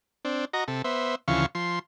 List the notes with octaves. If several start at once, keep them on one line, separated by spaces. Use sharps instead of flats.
C4 D4
F#4 D#5 A#5
C3 A4
B3 C5 E5
D2 C#3 E3 F3 F5 C#6
F3 C6